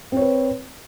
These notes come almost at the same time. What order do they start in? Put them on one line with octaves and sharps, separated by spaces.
C4 C#5 B4